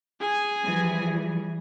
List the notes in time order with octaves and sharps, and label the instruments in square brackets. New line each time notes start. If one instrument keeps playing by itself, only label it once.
[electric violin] G#4 G#5
[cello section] E3 F3 G3